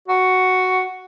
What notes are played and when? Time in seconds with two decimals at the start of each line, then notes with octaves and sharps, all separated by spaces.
0.08 F#4